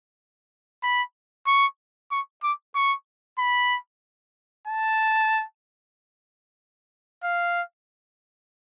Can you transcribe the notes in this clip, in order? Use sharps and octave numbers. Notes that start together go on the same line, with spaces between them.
B5
C#6
C#6
D6
C#6
B5
A5
F5